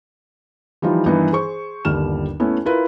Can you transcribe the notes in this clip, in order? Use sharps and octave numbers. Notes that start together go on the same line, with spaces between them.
E3 F3 G3 D#4 F4
G2 D#3 E3 B3 D#4 E4
G#4 C5 C#6
G1 D#2 G3 F6 E7
A3 B3 C#4 E4
E4 F4 A#4 B4